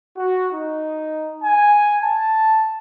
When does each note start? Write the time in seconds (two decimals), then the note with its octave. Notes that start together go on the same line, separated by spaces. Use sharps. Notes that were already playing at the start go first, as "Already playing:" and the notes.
0.18 F#4
0.53 D#4
1.43 G#5
2.02 A5